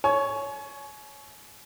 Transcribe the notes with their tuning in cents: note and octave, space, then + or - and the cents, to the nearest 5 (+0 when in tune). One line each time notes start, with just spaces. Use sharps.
C#5 +5 G#5 +35